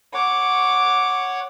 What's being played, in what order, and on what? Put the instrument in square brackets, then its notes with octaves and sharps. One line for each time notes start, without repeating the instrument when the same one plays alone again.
[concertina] C#5 F#5 [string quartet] D6